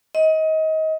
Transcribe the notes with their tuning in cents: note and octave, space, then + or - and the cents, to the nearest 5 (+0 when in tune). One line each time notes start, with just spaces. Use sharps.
D#5 +25